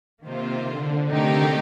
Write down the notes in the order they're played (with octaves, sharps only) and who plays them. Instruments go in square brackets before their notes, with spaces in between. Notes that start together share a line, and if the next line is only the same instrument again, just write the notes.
[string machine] C3 [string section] D#3 A#3 F4 C5
[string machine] D3
[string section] C3 D#3 A3 D#4 G4